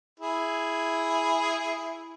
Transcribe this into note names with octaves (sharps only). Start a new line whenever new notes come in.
E4 G#4